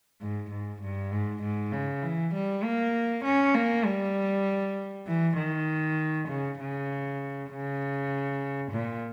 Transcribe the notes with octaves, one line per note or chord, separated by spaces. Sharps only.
G#2
G#2
G2
G#2
G#2
C#3
E3
G3
A#3
C#4
A#3
G3
E3
D#3
C#3
C#3
C#3
A#2